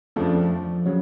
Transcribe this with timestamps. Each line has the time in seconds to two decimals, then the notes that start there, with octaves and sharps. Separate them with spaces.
0.16 F2 C#3 F3 A3 D4
0.51 F3
0.86 C#3 F#3